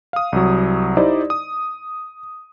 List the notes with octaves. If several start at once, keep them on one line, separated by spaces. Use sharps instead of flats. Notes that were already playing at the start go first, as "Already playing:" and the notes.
F5 D#6
C2 F#3
D#4 E4 G4 C5 D5 D#5
D#6